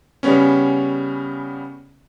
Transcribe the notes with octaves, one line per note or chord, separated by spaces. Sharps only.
C#3 G3 B3 C#4